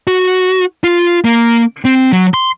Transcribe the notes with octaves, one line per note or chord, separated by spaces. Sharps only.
F#4
F4
A#3
C4
F#3
C6